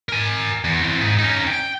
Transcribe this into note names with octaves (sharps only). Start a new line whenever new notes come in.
A#4 G#5
E2
E3 C4
G#2 G#4
C#4 D#4
G5